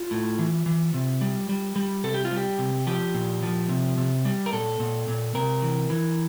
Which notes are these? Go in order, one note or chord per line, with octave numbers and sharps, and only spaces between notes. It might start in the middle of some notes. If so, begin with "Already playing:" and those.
Already playing: F4
A2
E3
E3
C3
G3
G3
G3
C3 A4
G4
F4
G3
G4
C3
F3 G4
A#2
F3
C3
C3
G3
A#4
A#2 A4
A#2
A#2
C3 A#4
E3
E3